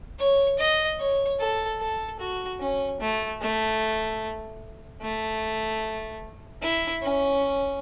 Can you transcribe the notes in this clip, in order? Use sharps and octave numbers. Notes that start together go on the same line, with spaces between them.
C#5
D#5
C#5
A4
A4
F#4
C#4
A3
A3
A3
E4
C#4